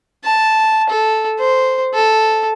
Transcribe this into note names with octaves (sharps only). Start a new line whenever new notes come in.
A5
A4
C5
A4